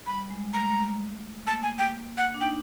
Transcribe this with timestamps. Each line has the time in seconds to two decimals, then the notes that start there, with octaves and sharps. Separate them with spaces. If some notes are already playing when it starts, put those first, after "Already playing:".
0.07 G3 B5
0.31 G#3
0.53 A3 A#5
0.63 G#3
0.71 A3
1.47 A#3 A5
1.63 G#5
1.78 G5
2.18 F#5
2.34 D4
2.41 D#4 G5